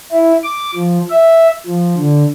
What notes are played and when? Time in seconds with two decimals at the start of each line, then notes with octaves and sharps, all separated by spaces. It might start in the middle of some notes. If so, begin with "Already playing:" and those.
0.12 E4
0.44 D6
0.75 F3
1.10 E5
1.67 F3
1.97 D3